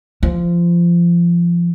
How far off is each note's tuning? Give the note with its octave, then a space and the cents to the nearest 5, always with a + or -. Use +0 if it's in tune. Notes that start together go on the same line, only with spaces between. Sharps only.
F3 -20